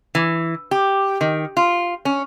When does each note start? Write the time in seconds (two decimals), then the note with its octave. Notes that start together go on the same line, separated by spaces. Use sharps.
0.15 E3
0.71 G4
1.21 D#3
1.57 F4
2.05 C#4